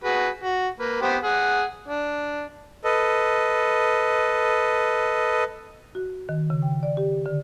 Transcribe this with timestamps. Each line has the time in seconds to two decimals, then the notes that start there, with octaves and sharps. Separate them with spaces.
0.04 F#4 G#4 B4
0.43 F#4
0.80 A#3 B4
1.02 B3 G4 C5
1.23 G#4 F#5
1.88 D4
2.84 A4 B4 D#5
5.95 F#4
6.29 D#3
6.50 C#3
6.62 G5
6.83 D5
6.97 G4
7.26 D3